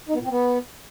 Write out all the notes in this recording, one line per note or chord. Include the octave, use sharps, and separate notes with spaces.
D#4
B3
A#2
C4
B3